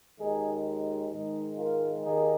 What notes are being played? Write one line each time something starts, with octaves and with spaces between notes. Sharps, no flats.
D#2 D#3 G#3 D#4 G#4
G#2 D#3 G#3 D#4
F4 A#4
D#2 D#3 A#3 D#4 G#4